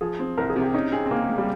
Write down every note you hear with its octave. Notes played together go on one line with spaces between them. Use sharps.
F3 G#4
C4
C2 A#4
G#4
C3
G4
C#4 D#4
C4 G#4
C4
C#3 A#3
G#3
G3